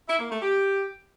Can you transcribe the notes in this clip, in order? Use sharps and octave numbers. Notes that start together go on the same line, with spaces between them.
E4
A#3
A3
G4